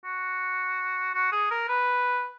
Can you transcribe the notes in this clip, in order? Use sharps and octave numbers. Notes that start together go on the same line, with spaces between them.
F#4
F#4
G#4
A#4
B4